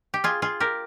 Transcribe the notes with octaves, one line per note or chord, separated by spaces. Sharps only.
G4
F4 G#4
F4 G#4
G4 A#4